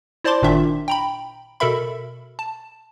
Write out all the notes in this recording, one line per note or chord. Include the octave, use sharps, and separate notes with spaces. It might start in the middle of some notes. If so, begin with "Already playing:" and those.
E4 C5 D5 A5 C6 D6
G#1 A#2 D#3 D4 E5
G5 A#5 B5
B2 A4 A#4 E5 B5
A5